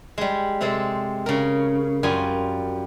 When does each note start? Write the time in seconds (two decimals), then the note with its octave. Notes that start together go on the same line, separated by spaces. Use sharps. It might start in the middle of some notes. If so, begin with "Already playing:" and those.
0.18 G3 G#3
0.61 C3 G#3 C4 A4
1.26 C#3 A#4
2.03 F#2 G3 F4 G#5